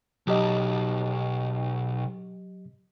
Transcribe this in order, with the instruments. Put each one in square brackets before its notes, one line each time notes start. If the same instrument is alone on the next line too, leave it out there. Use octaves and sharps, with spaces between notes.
[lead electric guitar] B1 [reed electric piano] F#3 G4 D#5